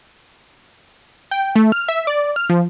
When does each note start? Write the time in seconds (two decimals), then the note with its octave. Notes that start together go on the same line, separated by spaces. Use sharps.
1.31 G5
1.56 A3
1.72 F6
1.89 E5
2.07 D5
2.36 F6
2.49 F3